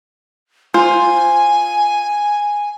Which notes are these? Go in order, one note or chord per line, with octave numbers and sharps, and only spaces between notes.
F4 C5 G#5